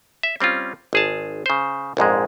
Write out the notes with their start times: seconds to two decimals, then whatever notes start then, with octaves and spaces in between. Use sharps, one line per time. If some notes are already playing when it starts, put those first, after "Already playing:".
0.23 E5
0.40 G3 C4 C#4 F4
0.93 G#1 G#4 A5
1.46 C#3 C5
1.97 A#1 F2 G#2 G#3